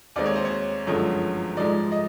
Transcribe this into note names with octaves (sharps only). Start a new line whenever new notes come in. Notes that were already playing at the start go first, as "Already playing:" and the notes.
D#2 D#3 G#3 C4 D5
C#5
C5
C#5
G1 F#2 D3 F3 G#3 C#5
G#2 F3 G#3 D5
D#5